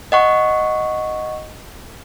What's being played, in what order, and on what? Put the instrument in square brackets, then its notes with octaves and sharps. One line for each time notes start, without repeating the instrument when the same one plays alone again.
[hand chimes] D#5 F#5 C#6